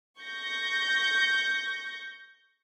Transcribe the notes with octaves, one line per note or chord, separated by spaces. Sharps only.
C#6 G6 A#6